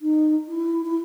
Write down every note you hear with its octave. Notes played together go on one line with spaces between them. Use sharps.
D#4
E4
E4